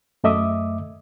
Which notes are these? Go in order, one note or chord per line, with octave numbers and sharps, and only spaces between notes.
F#2 A3 D#5 E5 D6 D#6